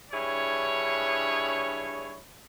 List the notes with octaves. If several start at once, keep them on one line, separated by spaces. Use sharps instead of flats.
G2 D4 E4 G#4 C#5